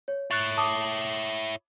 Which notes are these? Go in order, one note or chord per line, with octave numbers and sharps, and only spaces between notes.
C#5
E4 C#5 F#6 A6
A5 D6 D#6